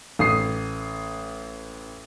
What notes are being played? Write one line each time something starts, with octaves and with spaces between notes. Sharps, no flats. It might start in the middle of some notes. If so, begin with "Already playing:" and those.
A1 D#6 C7